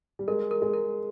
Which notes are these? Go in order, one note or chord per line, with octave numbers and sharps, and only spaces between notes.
G3
G#3 A#4
A#4
G#3
A#4